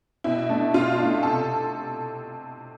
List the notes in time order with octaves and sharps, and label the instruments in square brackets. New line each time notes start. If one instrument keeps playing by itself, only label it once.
[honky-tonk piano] B2 E4
A3 D4
B2 F4
A3 D4
C3 A4